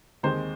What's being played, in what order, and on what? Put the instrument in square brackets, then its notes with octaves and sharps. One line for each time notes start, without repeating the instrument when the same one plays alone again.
[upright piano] D#2 D#3 G#3 C4 C5